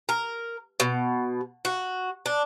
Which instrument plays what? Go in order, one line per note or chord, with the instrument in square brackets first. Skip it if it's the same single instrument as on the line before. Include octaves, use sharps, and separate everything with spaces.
[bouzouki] A#4
B2
F#4
D4